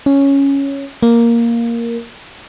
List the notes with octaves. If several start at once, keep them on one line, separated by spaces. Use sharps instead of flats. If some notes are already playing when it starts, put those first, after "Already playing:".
C#4
A#3